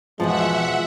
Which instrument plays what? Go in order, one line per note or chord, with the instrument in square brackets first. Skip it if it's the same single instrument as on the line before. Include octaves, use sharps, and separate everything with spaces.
[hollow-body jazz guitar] E2 F3 [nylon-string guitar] B2 F4 A5 [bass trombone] G#3 [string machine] E5 F#5